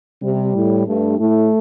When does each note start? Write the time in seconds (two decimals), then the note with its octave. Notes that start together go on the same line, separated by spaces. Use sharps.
0.23 C3 G3
0.55 A2
0.87 G2 A3
1.19 A2 A3